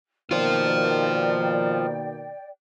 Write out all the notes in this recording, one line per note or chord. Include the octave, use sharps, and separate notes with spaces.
B2 D#3 A#3 F4 C5 D5 G5